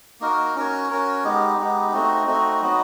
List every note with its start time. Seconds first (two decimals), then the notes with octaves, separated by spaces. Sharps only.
0.21 A#3 D#4 F#4 A#4
0.55 C#4 F#4 A#4 C#5
0.90 C#4 F#4 A#4 C#5
1.24 G#3 B3 D#4 G4
1.58 G#3 B3 D#4 G4
1.92 A3 C4 D#4 F#4
2.27 A3 C4 D#4 F#4
2.62 F#3 B3 D#4 F#4